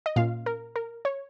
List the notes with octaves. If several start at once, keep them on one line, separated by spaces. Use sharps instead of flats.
D#5
A#2 A#3 C#4 F4 F5
A#4
A#4
C#5